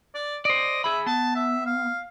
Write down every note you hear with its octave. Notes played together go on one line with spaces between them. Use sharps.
D5
C5 D5 D#5
G#4 E5 B5
B3 A5
E5
F5